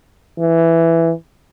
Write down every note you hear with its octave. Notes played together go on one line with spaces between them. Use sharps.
E3